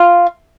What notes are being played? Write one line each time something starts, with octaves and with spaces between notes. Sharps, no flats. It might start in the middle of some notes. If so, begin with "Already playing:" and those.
Already playing: F4